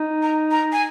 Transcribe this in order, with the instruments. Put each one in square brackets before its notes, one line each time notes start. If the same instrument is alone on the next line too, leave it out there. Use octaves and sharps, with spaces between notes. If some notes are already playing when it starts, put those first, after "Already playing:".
Already playing: [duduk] D#4
[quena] A#5
A#5
G#5